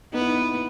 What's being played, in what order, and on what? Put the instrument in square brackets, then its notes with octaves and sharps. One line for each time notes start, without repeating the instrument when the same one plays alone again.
[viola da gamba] B3 [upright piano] D#4
[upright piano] E4
D#4